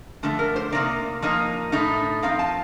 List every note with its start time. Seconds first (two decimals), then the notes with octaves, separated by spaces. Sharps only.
0.23 D3 F3 A3 A4
0.39 A#4
0.56 C5
0.72 C3 F3 A#3 D#4 D5
1.22 F3 A#3 D#4 D#5
1.72 A2 A3 D#4
2.23 F3 C4 D#4 F5
2.39 A5